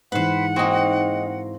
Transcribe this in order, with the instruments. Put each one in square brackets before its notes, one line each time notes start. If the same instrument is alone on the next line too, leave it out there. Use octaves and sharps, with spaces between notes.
[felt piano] G#2 E3 [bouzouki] B4 C5 [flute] F#5
[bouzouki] G#3 D#4 [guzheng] A#3 C4 F#4